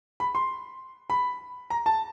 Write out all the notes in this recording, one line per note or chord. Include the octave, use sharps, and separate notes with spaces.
B5
C6
B5
A#5
A5